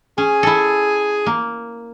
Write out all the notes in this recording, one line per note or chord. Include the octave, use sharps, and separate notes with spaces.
C#4 G#4 G#5
E4 A4
A#3